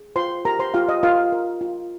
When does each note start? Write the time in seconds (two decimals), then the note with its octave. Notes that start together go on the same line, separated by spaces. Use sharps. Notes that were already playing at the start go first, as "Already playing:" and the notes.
Already playing: G#4
0.16 F4 C5 C6
0.45 G4 A#4 A#5
0.59 C5 C6
0.74 F4 G4 F5
0.89 D#5
1.03 F4 A#4 F5
1.32 A#4
1.61 F4